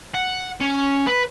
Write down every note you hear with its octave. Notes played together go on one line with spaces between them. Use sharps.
F#5
C#4
B4